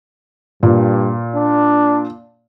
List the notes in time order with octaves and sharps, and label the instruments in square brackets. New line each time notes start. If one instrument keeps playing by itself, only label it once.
[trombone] G2 [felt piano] A#2
[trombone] D4